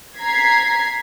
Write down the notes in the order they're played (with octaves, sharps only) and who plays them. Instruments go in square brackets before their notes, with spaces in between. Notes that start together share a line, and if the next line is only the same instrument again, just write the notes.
[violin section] A#5 G#6 B6 C7